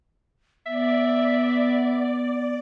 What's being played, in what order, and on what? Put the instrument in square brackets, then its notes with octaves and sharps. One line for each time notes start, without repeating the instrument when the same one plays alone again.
[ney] B3 [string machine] D5 [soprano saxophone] E5